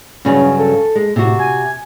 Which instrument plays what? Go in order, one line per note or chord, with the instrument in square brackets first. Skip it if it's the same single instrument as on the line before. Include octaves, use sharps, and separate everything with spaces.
[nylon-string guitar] G2 C#3 F#3 [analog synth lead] C#4
[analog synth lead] A4
[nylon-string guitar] G#3
[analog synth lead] A2 [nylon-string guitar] C3 F#4
[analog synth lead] G#5